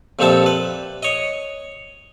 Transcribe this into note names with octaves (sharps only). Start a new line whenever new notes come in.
F2 A#2 G3 C4 E5 A5
B4
C#5 D#5